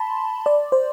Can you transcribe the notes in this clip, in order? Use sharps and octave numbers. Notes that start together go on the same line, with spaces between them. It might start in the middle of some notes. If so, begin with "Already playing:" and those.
Already playing: A5 B5 C6
D5
C5